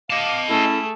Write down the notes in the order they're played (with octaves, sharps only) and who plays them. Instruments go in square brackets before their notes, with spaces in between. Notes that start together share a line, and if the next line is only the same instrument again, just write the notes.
[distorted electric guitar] D#5 A5 [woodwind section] F5 D6
[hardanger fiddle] A3 G#4 [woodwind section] C#4 E4 A4